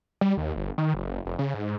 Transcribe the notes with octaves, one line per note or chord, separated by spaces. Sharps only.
G3
D#2
G1
D#3
F#1
F1
C#3
G#2